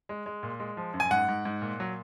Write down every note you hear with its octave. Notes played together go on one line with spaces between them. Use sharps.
G#3
G#3
A#2
G#3
F3
F#2
G#5
G#2 F#5
G#2
G#2
A#2
F#3